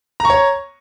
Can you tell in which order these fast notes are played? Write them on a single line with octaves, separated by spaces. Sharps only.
A#5 C#6 C#5